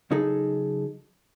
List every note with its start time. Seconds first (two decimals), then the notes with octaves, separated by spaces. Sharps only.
0.11 C#3 F#3 D#4 G#4 A4